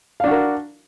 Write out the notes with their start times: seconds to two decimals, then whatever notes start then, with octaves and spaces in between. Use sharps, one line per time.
0.20 F5
0.24 D4
0.27 F#4
0.31 A#4